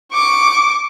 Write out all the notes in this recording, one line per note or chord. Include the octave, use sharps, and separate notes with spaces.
C#6 D6